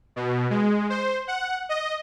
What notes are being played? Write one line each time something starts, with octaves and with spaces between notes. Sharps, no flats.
B2
G#3
C5
F#5
D#5